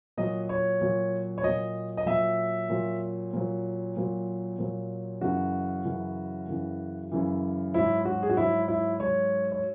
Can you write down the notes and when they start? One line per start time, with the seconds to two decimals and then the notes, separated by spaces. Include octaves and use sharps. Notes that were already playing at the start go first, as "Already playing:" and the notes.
0.17 A#2 F#3 D#5
0.49 C#5
0.81 A#2 F#3
1.38 C#5
1.43 A#2 F#3 D#5
1.97 D#5
2.06 A#2 F#3 E5
2.70 A#2 F#3
3.33 A#2 F#3
3.97 A#2 F#3
4.58 A#2 F#3
5.21 F#2 C#3 E3 F#4
5.85 F#2 C#3 E3
6.48 F#2 C#3 E3
7.12 F#2 C#3 E3
7.74 G#2 F#3 E4
8.05 F#4
8.22 G#4
8.29 F#4
8.37 G#2 F#3 E4
8.68 E4
9.00 G#2 F#3 C#5
9.52 C#5